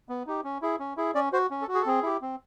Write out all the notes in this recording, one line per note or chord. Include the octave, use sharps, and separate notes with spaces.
B3
D#4 G4
C#4
E4 G#4
C#4
E4 G#4
C#4 D5
F#4 C5
C#4
A4
F#4
G#4
A4
C4 G#4
E4 G4
C4